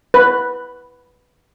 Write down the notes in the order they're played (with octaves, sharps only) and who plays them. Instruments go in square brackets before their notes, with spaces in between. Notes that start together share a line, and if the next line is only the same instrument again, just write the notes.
[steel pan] B4